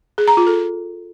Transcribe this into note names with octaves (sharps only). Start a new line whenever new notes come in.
G#4
A#5
F4
A4